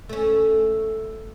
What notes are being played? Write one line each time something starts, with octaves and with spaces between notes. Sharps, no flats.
A3 C#4